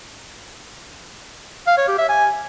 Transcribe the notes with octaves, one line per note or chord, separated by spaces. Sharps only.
F5
C#5
G4
E5
G#5